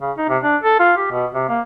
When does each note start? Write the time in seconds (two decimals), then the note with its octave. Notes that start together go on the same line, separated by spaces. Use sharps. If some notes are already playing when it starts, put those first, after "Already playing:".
0.01 C#3
0.18 D#4
0.29 C3
0.43 D4
0.63 A4
0.80 F4
0.97 G4
1.11 B2
1.34 C3
1.49 A#3